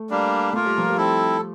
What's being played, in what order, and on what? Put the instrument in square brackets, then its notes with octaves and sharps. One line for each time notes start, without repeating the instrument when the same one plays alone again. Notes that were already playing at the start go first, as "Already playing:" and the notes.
Already playing: [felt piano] A3
[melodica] G3 A#3 D4
[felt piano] A3 [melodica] A#3 F4 A#4
[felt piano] G3
F3
G3
[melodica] C4 E4 A4